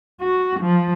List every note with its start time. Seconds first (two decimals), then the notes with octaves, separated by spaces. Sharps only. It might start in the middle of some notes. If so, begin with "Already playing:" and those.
0.21 F#4
0.60 F3